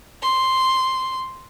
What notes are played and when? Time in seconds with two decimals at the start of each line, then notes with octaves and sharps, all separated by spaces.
0.22 C6